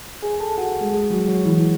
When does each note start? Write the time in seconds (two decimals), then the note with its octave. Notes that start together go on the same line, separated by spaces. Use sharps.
0.22 G#4 G#5
0.40 A4 A5
0.58 F#4 F#5
0.81 G#3 G#4
0.93 G#3 G#4
1.10 F#3 F#4
1.27 F#3 F#4
1.45 E3 E4